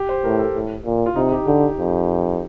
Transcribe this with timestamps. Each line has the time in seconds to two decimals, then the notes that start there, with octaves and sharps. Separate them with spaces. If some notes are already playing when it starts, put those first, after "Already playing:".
Already playing: G4
0.09 C5
0.24 A2 A#4
0.39 A4
0.55 A2
0.85 A#2
1.06 F4
1.16 C3 D#4
1.32 G4
1.46 D3 G4
1.78 F2